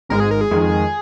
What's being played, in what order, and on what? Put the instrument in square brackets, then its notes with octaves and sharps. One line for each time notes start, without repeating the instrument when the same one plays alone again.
[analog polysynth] G#1 G#2 G#3 [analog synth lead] A#4
[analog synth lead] G#4
A#4
G#4
[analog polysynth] F2 D#3 G#3